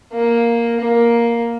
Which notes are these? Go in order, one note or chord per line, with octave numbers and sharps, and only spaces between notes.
A#3
A#3